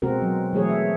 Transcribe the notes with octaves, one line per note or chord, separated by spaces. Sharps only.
B2 G#3 C4 F#4 A#4
F#3
E3 F#3 A3 G#4 C#5
E5